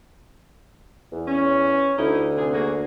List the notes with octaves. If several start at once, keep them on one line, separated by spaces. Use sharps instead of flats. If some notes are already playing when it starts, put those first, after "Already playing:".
E2
C#4
D2 D#4 E4
C3 G#4
A#3 F#4 G#4